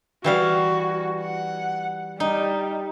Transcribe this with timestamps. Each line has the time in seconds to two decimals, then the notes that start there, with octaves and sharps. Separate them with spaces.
0.24 E3 G3 F#4 F5
1.21 F#5
2.20 G3 D#4